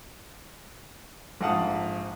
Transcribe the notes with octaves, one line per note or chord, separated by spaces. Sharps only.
A#1 G#2 F5 F#5 A5 D#6